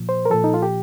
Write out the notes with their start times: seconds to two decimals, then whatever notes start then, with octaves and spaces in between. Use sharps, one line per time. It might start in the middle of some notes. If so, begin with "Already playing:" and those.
Already playing: A#2 F3
0.09 C5
0.25 A#4
0.30 A#2 F3 A4
0.44 D#4
0.54 F4
0.62 G4